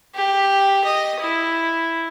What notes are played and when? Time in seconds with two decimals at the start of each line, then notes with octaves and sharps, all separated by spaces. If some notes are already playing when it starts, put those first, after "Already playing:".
0.15 G4
0.85 D#5
1.21 E4